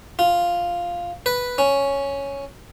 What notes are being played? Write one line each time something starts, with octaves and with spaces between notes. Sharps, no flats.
F4
B4
C#4